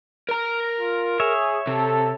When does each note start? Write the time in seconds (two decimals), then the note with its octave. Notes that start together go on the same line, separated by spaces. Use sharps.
0.29 A#4 A#5
0.79 F4
1.20 G#4 C#5 E5
1.67 C3 A4